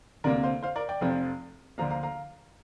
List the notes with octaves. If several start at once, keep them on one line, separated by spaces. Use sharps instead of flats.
D2 C3 A#3 A#4 D5
C5 F5
C5 F5
A#4 D5
D5 G5
F1 F2 F3
D2 D3 F3 A#3 F5 A#5
F5 A#5
F5 A#5